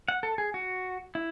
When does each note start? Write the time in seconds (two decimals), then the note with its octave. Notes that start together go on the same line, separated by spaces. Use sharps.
0.08 F#5
0.23 A4
0.38 G#4
0.54 F#4
1.15 E4